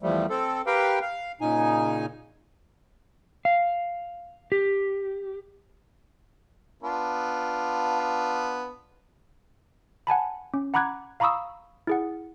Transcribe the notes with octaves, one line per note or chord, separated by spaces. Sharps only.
E2 F3 G3 A3
C4 A4
G4 A#4 B4 F5 G5
F5
A#2 C#3 D#4 G#5
F5
G4
B3 D4 F4
F#5 G#5 A5 B5
C#4
F#5 A#5 B5 D6 F#6 G#6
F5 A#5 B5 C#6 D#6 E6
E4 G#4 F#5